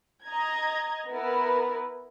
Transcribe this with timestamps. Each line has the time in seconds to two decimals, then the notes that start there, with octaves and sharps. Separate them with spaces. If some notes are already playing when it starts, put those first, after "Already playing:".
0.25 D#5 A#5 G#6
1.10 B3 E4 A#4 B4